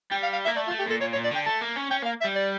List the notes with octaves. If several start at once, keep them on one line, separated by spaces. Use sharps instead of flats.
G3 G5
F5
F5
A#3 E5
A3 D5
F4
A3
G4
A#2 A4
A#2 C#5
C#5
A#2
D5
D3 G5
A3 A5
A#3
C#4
C#4 G5
A#3 F5
E5
G3
D5